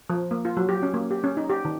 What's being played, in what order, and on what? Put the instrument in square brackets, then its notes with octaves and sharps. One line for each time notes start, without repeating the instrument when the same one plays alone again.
[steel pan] F3
A#3
F4
F#3
G4
C#4
A#3
G4
C#4
D#4
G4
D#3